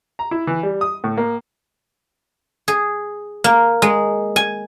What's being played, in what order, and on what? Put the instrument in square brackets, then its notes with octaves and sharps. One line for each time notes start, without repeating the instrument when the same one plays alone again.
[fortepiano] A#5
E4
E3
G3
D#6
A2
A#3
[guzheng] G#4
A#3
G#3
G#5